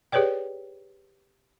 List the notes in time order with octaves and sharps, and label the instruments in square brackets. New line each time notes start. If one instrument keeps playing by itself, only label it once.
[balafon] G4 G#4 B4 C#5 D5 G5